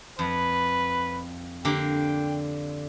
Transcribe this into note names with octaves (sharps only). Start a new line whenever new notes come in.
F2 B4
D3 A#3 G4 G5